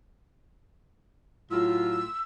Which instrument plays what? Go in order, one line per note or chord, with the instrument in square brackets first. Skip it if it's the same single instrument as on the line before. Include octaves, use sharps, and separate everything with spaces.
[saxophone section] A2 F#3 F4 [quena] E6